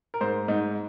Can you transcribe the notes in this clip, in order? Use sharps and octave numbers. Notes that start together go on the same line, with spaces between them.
A#4
G#2 C5
G#2 D#4